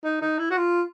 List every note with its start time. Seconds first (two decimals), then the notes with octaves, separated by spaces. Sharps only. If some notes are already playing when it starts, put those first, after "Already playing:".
0.04 D#4
0.21 D#4
0.39 E4
0.50 F#4
0.57 F4